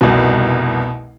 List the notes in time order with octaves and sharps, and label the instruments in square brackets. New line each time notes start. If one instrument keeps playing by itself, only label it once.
[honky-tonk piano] F1 C2 [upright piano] B2